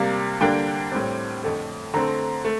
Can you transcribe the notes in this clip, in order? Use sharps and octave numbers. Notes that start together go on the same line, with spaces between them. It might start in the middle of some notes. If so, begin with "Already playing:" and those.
Already playing: C3 G3 A#3 F5
D3 G3 A#3 D4 G5
A2 G3 C4
F2 D3 A3
D3 A3 C4 A#5
A3